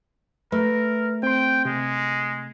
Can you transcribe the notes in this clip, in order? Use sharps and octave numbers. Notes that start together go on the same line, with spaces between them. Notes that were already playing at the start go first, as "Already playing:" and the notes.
A3 A#4 B4
C4 G5 C6
C3 G#3